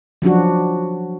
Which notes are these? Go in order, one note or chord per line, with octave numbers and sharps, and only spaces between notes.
F3 F#3 D4 F#4